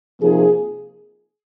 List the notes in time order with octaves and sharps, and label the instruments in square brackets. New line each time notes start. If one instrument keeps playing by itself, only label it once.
[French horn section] C3 F3 A#3 D#4 G#4